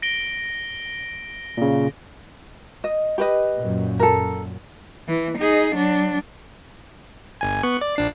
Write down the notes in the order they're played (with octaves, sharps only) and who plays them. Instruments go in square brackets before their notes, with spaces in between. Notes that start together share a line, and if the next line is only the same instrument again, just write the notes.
[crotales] A#6 D7 G7
[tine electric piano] A#2 C#3
[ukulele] D#5
G4 B4 D#5
[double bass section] F#2 A#2
[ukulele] A4 A#4
[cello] E3
D#4 G#4
F#3 D4
[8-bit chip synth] G1 G#5
B3 C#6 F#6
D5
A#1 D4 C7